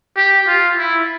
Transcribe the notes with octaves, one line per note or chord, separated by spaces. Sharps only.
G4
F4
E4